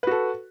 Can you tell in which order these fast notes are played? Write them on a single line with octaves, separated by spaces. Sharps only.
B4 F#4 A4